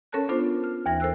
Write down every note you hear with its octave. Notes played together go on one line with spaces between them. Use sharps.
C#4 A4 A#4 C#5 A5 F#6
B3 D4 F4 A4 C5
F6
D#2 E3 A#6
A4 A#4 C5 E6 F#6